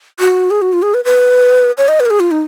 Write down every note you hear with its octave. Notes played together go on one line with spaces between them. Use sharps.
F#4
G#4
F#4
F4
G#4
B4
B4
C#5
D#5
B4
A#4
G#4
F4
D#4